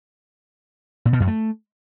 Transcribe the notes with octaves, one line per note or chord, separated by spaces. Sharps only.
A#2
B2
F#2
A3